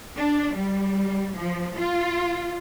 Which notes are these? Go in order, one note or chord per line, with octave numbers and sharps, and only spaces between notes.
D4
G3
F3
F4